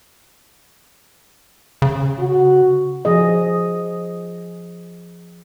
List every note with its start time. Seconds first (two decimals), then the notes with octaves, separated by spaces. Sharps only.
1.82 C#3
2.20 F#4
3.05 F3 G#4 D#5